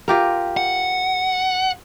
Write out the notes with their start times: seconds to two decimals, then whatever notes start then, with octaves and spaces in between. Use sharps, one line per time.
0.08 F4 G4 A#4
0.57 F#5